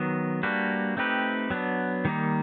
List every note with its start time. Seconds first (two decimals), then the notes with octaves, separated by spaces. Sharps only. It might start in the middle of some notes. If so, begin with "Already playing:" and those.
Already playing: D#3 F#3 B3
0.43 G3 A#3 D4 F#4 B4
0.97 A3 C4 D#4 G4 B4
1.50 F#3 B3 D4
2.05 D#3 G3 A#3 D#4